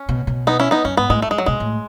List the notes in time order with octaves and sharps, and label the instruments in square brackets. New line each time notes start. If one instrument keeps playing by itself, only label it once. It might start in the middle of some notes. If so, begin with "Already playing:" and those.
Already playing: [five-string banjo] C#4
[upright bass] B2
B2
[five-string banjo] B3 D#4
C#4 E4
B3 D#4
[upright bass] F#2 [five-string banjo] C#4
[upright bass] G#2 [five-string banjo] B3
[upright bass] A2 [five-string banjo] G#3
[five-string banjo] A3
G#3
F#3
[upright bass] B2 [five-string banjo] G#3
[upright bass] A2